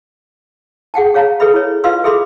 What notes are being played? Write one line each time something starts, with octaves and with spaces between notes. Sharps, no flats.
G#4 F#5 G5 A5
G#4 C#5 F5 A5 A#5
G#4 A4 B4 E5 B5
E4 C#5
F4 B4 D#5 F5 C6 E6
G#4 A4 E5 B5 C6 D6